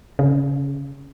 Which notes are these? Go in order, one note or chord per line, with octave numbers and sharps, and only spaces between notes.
C#3